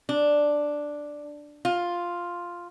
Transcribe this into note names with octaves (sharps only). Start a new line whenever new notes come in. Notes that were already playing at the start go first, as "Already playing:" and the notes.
D4
F4